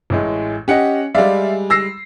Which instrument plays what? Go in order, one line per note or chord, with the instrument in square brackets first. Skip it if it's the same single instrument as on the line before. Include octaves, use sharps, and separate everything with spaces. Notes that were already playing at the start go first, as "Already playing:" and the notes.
[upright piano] A1 A2 G#3
[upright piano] C#4 F#5 C#7 [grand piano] G4 D#5
[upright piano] G3 G#3 [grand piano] D5 E5 F5
[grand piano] E6 A#6 C7